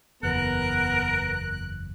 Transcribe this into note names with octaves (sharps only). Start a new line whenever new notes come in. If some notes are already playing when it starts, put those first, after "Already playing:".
F#1 E2 B3 A#4 F#6